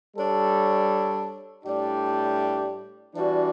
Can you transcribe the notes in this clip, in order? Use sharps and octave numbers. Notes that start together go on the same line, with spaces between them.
G3 D4 A4 C#5
A2 G3 D4 G4
E3 G3 D4 F#4